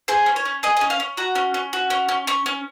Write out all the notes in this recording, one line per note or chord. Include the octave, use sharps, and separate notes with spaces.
G#4 C5
C#4
C#5
C#4
G#4 D#5
D#5
C#4
F5
C#4
F#4 A#5
C#4
C#4
F#4
C#4
C#4
C#4 C#6
C#4